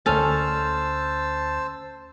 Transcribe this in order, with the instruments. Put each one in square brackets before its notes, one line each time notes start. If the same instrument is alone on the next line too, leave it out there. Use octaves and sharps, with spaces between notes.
[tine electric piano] D2 F6 A6 [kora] C#4 A4 [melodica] C5 A5 E6